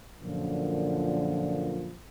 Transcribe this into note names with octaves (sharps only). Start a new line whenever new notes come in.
F#2 A#2 D3 F3